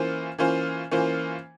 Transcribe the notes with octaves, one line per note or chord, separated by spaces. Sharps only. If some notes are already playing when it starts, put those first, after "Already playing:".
Already playing: E3 A#3 C#4 F4 C5
E3 A#3 C#4 F4 C5
E3 A#3 C#4 F4 C5